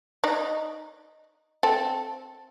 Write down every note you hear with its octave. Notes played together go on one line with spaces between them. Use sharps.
D#4 D5
C4 A4